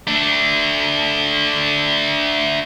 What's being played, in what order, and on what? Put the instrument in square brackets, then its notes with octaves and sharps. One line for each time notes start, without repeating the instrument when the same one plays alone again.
[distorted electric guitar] A3 D4